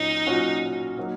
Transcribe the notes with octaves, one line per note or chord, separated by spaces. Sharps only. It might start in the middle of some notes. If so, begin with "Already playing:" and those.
Already playing: A#2 F#3 C#4 D#4 F#4
A#2 F#3 C#4 F#4
F#3 A#3 D#4 F#4